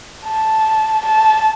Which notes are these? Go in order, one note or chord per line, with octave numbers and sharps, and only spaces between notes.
A5
A5